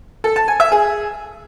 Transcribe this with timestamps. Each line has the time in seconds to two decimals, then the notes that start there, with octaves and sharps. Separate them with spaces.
0.24 A4
0.36 A5
0.48 G#5
0.60 E5
0.72 G#4